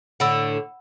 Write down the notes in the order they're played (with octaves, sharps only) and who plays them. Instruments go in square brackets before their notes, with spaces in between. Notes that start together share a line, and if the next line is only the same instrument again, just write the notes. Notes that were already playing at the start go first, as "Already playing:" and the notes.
[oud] A2 D3 [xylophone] F#5 B5 E6